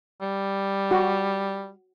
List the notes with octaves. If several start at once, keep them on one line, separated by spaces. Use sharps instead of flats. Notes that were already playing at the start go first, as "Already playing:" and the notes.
G3
F#4